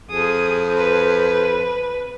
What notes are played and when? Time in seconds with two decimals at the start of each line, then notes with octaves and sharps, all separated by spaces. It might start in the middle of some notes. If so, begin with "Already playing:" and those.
0.10 F2 G#4 D#6
0.77 B4